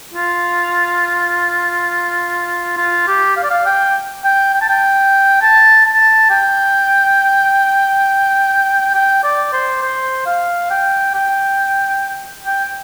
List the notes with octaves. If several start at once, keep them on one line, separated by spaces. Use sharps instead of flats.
F4
F4
G4
F5
D5
F5
G5
G5
G5
A5
G5
A5
A5
G5
G5
D5
C5
C5
F5
G5
G5
G5